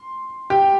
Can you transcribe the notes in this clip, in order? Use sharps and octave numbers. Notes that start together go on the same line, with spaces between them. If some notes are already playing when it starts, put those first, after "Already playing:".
Already playing: C6
G4 G5